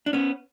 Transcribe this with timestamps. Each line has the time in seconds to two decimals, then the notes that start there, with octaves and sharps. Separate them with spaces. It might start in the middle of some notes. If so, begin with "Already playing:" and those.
0.06 D4
0.13 B3 C#4